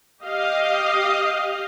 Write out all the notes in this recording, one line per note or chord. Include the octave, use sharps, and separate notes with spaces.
G4 D#5 F5